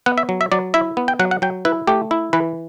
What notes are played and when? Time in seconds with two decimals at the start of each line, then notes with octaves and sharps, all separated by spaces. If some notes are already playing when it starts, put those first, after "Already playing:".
0.06 B3 F#5
0.18 E5
0.29 F#3
0.41 E5
0.52 F#3 D5
0.74 E4 E5
0.97 B3
1.08 G5
1.19 F#3 F#5
1.31 F#5
1.42 F#3 G5
1.65 E4 B4
1.87 A3 G4
2.11 E4
2.33 E3 B4